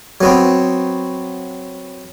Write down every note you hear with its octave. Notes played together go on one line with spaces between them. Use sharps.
F#3 B3 C4